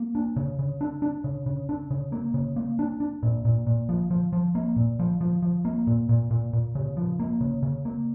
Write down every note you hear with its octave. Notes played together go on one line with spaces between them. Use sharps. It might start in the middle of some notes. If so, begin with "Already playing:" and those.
Already playing: A#3
D4
C#3
C#3
D4
D4
C#3
C#3
D4
C#3
A#3
C#3
A#3
D4
D4
A#2
A#2
A#2
F3
F3
F3
A#3
A#2
F3
F3
F3
A#3
A#2
A#2
A#2
A#2
C#3
F3
A#3
C#3
C#3
A#3